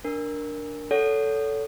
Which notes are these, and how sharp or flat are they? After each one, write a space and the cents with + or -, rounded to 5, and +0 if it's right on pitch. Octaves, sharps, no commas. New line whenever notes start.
D4 +0 A#4 +0
A4 +0 C#5 +30 F#5 +0